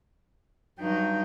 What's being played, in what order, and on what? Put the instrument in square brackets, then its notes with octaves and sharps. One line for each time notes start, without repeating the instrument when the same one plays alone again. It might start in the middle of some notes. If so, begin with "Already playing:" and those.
[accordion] G2 G5 G6 [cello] F#3 D#4